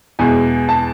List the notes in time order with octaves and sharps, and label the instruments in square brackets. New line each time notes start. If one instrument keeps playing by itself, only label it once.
[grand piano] E2 B2 G#3 G#5
A5